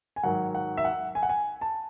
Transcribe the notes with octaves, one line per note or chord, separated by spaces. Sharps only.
G#5
G#2 D#3 F#3 F#5
F#5
E5
F#5
G#5
F#5
G#5
A5